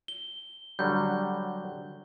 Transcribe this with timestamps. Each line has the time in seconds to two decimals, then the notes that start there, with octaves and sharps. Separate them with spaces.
0.08 G7
0.79 D3 F#3 G3 G6